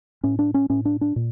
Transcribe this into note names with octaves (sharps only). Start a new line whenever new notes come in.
A2 C#4
D4
C#4
A2 C#4
D4
D4
A#2